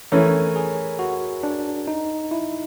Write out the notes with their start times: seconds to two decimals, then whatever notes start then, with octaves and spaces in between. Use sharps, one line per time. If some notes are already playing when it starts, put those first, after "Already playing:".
0.12 E3 A3 C#4 A#4
0.56 G#4
0.99 F#4
1.43 D4
1.88 D#4
2.31 E4